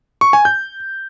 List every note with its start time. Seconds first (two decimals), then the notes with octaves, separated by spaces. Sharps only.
0.21 C#6
0.33 G#5
0.45 G6